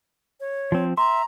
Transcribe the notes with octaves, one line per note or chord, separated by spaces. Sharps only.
C#5
F3 C4
E5 A#5 C6